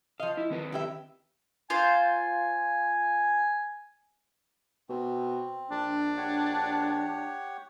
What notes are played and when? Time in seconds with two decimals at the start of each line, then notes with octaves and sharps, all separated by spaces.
0.20 F3 D#5 F5
0.37 E4
0.50 D#3 C4 B4
0.72 E4 G4 E5
1.70 F4 C5 G#5
4.89 B2 C4
5.71 A#1 D4
6.17 G4 C#5 F#5